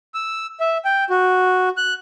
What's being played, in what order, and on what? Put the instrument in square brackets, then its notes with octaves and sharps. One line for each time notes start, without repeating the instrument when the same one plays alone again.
[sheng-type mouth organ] E6
E5
G5
F#4
F#6